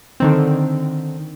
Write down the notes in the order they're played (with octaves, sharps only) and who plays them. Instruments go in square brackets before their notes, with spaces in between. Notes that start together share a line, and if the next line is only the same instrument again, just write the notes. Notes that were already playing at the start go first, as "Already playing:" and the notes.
[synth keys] D3 D#3 C4